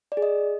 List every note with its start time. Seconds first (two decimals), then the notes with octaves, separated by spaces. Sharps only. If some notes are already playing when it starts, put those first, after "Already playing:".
0.12 D5
0.17 G#4
0.22 D#5